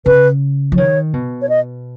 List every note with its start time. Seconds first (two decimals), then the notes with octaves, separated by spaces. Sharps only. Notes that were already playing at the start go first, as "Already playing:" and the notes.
0.06 C#3 B4
0.72 F3
0.77 D#3 C#5
1.13 B2
1.42 C#5
1.49 D#5